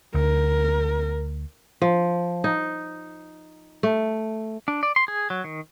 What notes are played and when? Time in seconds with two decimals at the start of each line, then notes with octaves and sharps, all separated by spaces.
0.15 D2 A#4
1.82 F3
2.44 D#4
3.83 A3
4.68 D4
4.83 D5
4.96 C6
5.08 G#4
5.30 F#3
5.44 D#3